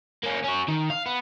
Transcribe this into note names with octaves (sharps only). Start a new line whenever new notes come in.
A#3 C#4
C#4 F#4
D#3
F5
B3